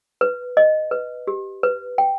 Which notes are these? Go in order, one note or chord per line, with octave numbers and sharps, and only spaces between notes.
B4
D#5
B4
G4
B4
G5